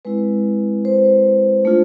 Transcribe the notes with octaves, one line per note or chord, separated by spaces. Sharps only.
G#3 C4 E4 B4
C5
A3 D4 F4